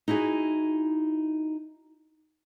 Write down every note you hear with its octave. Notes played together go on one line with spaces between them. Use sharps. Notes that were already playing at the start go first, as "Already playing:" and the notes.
D#4 E4 F#4 G#4